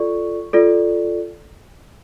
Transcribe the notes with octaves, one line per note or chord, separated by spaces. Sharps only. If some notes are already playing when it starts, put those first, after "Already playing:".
Already playing: F4 A4 D5 C#6
F4 A4 D5